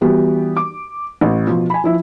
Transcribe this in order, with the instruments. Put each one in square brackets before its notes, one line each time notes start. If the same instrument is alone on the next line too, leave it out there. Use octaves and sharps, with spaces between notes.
[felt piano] E3 G3 B3 F#4 G4
D6
A1
B2 F3 F4
G#5 B5
F3 E4 E5